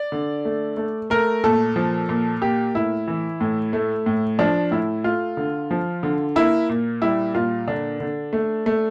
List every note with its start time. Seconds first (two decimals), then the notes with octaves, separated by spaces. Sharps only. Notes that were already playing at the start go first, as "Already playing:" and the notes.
Already playing: D5
0.12 D3
0.45 A3
0.77 A3
1.10 A3 A#4
1.44 A#2 A4
1.76 F3
2.09 A#2
2.41 A#3 G4
2.75 A2 E4
3.08 E3
3.40 A2
3.73 A3
4.06 A2
4.39 F3 D4
4.71 A2 E4
5.04 A3 F4
5.37 D3
5.71 F3
6.03 D3
6.36 A#3 E4
6.69 A#2
7.02 G3 E4
7.35 A#2 F4
7.68 D3 D4
8.00 D3
8.33 A3
8.66 A3